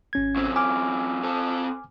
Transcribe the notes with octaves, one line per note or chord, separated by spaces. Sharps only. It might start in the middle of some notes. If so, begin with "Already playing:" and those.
G#1 C#4 G#6
F#2 C4
G#5 D6 F6
C4 A4